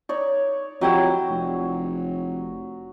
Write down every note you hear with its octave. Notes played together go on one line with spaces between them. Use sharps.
D#4 C#5 D5
F2 F#3 E4 F#4 G4 D#5
F1